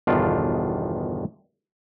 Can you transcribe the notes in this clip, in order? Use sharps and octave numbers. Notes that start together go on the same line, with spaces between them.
G1 E2 B2 D#3 D4 F4